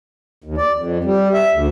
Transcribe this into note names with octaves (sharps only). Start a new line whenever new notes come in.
D#2
D5
F2
G3
E5
D2